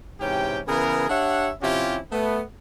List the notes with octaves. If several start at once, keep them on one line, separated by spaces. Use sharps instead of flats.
G#2 C3 E3 C#4 G4 G5
C#3 E3 B3 G#4 A#4
D4 G4 C#5 E5 F#5
C3 F3 C#4 E4 F4 G4
A3 B3